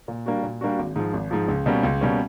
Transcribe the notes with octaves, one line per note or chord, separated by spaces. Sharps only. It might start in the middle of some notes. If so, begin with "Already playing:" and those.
A#2
G3 A#3 D4 F#4
A#2
G3 A#3 D4 F#4
G#1
G#2 F3
G#1
G#2 F3
C#2
B2 G3 A#3 C#4
C#2
B2 G3 A#3 C#4